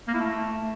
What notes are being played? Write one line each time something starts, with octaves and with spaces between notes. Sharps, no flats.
A#3
E4
A3